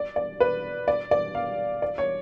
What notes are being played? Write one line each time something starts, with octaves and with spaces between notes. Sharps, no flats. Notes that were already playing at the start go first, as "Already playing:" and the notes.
Already playing: D5
D5
B4
D5
D5
F5
D5
C#5